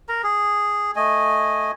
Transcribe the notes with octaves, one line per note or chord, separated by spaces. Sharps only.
A#4 A#5
G#4
A3 D#5 G#5